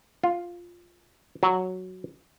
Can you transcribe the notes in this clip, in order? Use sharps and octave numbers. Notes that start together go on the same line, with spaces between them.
F4
F#3